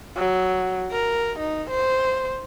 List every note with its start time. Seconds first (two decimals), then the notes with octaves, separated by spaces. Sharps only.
0.16 F#3
0.92 A#4
1.39 D#4
1.70 C5